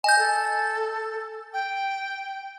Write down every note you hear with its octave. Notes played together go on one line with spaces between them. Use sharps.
D#5 G#5 G6
A4
G5